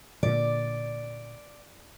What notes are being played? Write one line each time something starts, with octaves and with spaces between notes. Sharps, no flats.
A#2 D3 D5